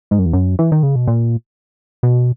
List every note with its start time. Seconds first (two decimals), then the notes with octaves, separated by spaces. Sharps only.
0.11 G#2
0.19 F#2
0.25 E2
0.33 F#2
0.59 E3
0.72 D#3
0.83 C#3
0.96 B2
1.08 A#2
2.03 B2